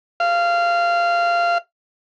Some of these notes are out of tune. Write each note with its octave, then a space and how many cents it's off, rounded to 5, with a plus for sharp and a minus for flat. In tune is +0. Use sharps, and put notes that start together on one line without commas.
F5 -15